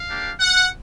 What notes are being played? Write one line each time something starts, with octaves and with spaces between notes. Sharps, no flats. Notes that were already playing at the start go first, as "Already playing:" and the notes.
Already playing: F5
A#3 D4 G4
F#5